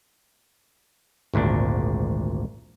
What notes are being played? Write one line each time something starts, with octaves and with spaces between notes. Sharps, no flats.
G#1 D2 A#2 D4